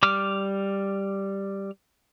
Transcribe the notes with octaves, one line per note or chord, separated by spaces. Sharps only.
G3 D6 F6